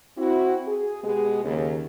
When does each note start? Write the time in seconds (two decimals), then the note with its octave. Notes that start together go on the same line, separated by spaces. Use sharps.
0.18 C4 E4 F#4
0.67 G#4
1.03 B2 G#3 B3 G4 G#4
1.44 D#2 C#3